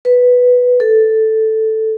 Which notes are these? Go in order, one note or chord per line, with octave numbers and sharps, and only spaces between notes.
B4
A4